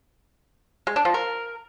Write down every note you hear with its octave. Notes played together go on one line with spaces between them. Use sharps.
G#3
D4
F3
A#4